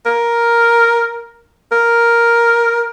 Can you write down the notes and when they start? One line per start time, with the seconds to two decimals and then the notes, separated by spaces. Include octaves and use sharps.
0.06 A#4
1.72 A#4